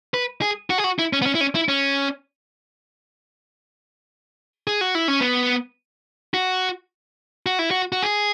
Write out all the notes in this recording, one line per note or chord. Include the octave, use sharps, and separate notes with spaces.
B4
G#4
F#4
G#4
F#4
E4
C#4
B3
C#4
E4
C#4
E4
C#4
G#4
F#4
E4
C#4
B3
F#4
F#4
E4
F#4
F#4
G#4